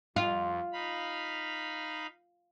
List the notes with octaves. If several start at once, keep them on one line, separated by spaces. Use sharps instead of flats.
F2 F4
D#4 F5 B5